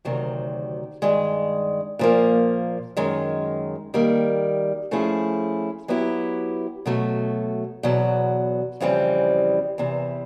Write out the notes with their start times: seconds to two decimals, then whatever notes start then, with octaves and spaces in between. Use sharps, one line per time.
0.05 D2 C3 D#3 F#3
1.02 G2 D#3 G#3
1.99 A#2 F3 A#3
2.97 F#2 D#3 G#3
3.94 D#3 G3 A#3
4.91 F3 A3 C#4 E4 G#4
5.88 F#3 B3 E4 G4
6.86 B2 F#3 A3
7.83 E2 B2 F#3
8.80 F2 C#3 E3 G3 C4
9.78 E2 C3 E3